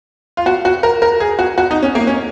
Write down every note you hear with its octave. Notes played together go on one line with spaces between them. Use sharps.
F4
F#4
F#4
A#4
A#4
G#4
F#4
F#4
D#4
C#4
A#3
C#4